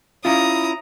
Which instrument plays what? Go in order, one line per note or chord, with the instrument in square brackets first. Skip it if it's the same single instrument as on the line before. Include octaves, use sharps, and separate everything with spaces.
[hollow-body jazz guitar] C#4 E4 F4 [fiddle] A#5 D#6